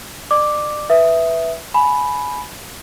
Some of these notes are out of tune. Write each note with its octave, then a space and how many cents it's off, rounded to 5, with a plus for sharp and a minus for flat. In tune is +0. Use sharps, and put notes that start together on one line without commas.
D5 +35 D6 +0
B4 +0 E5 +0 D#6 +0
G#5 +25 B5 +0